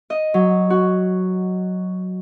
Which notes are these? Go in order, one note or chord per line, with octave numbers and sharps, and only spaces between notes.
D#5
F#3
F#4